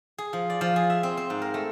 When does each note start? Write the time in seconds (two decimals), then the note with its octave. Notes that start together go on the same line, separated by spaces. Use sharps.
0.18 G#4
0.33 F3
0.50 D5
0.61 F3
0.76 G#4
0.90 E5
1.03 C4
1.17 C4
1.30 G#2
1.42 A#4
1.54 A3